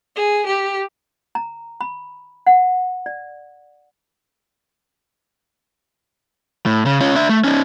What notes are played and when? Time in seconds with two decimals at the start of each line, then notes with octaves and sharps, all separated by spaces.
0.15 G#4
0.45 G4
1.35 A#5
1.81 B5
2.47 F#5
3.06 D5
6.66 A2
6.86 C#3
7.01 C#4 F4
7.15 D4 E5
7.29 A3
7.44 C#4 D#4